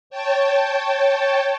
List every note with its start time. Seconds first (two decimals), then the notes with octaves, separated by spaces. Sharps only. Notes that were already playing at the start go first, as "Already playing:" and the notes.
0.10 C#5 G5 A5